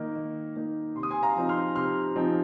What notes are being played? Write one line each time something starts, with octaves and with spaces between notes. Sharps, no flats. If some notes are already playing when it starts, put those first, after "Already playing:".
Already playing: D#3 A#3 D#4
D#3
A#3 D#4
C3 C6
D#6
G#5 C6
F5 A#5
F3 C4 D#4
C6 F6
C3 C6 F6
F3 C4 D#4